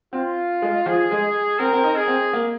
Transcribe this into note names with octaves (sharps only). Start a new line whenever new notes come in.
C4 F4
G#3
F3 G#4
G#3
C4 A#4
C4
D#4
G#4
C4
A#3